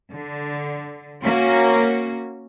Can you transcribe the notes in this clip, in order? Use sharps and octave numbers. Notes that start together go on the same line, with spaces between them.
D3
A#3 C#4 F#4